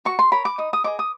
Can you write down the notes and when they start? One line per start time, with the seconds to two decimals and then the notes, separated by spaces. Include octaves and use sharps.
0.05 F#4 C#6
0.19 C6
0.32 A#4 C#5 B5
0.45 D6
0.58 D#4 D#6
0.73 D#6
0.84 G#4 C5 D#5 D6
0.99 D#6